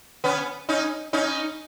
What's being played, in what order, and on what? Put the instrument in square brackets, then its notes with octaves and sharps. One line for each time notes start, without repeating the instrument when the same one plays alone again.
[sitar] B3 C#4
C#4 D#4
C#4 D#4